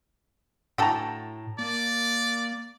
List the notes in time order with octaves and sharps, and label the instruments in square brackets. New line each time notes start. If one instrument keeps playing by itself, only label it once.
[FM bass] A2 [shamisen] D4 F#4 A4 [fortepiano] G5 A5 A#5
[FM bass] A#3 [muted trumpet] D5